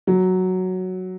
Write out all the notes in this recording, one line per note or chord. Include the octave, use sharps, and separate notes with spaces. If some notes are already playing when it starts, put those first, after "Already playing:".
F#3